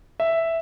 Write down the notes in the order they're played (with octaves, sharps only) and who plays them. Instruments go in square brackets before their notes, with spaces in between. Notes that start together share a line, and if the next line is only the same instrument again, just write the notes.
[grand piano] E5